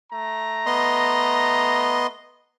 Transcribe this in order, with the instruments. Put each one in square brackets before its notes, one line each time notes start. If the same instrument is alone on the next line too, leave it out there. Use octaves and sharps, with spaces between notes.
[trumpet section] A3 A#5
[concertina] B3 D#5 C6